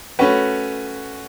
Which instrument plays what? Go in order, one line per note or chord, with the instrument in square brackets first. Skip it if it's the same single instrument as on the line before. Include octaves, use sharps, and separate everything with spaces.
[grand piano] A3 C#4 F#4 B4